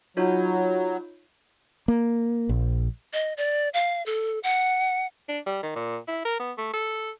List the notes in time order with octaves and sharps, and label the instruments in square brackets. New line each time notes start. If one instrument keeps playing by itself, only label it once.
[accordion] F#3 [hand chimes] D#4 F4 C#5
[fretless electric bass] A#3
A#1
[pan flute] D#5
D5
F5
A4
F#5
[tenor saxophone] D4
G3
D#3
A#2
E4
A#4
B3
A3
A4